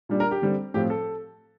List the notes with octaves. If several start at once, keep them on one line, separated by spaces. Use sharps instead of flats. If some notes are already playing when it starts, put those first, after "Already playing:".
A#2 G3 D4
A#4
G4
D3 G3 C4
A2 F3 C4 G4
A4